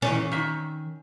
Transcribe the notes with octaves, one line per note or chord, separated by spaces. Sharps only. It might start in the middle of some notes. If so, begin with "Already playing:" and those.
A#2 D#3 E3 C#4
D#3 E5